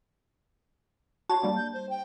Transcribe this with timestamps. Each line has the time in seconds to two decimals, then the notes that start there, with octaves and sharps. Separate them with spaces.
1.29 F#4 C#5 A5 C6
1.42 G3 A#3 D4
1.57 G6
1.73 C5
1.89 G5